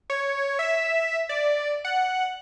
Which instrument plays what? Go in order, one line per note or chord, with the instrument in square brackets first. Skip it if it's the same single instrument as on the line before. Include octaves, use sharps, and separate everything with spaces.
[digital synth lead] C#5
E5
D5
F#5